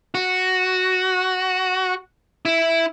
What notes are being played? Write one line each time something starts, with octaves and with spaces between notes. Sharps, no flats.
F#4
E4